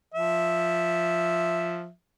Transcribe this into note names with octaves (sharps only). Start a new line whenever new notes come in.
F3 E5